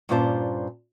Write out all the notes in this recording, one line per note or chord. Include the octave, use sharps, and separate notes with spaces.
G2 A#2 C#4 F4 C5 A5